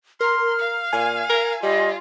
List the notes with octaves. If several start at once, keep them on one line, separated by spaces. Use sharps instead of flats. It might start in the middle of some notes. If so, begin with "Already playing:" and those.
A#4 C6 F6
F5
A#2 G#5
A#4
G3 F4 D#5